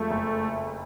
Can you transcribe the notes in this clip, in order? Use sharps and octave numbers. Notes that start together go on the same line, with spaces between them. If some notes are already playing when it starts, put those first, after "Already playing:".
Already playing: F2 F3 G#3 A3
F#1